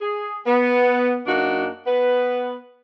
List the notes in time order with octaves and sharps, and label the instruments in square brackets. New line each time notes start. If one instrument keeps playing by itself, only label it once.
[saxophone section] G#4
B3
F#2 A#3 D4 D#4 F#4
B3 B4